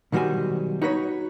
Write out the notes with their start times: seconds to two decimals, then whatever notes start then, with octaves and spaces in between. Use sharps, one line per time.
0.12 B1 D#3 G3 F#4 C5 G#5
0.82 D#4 F#4 B4 C#5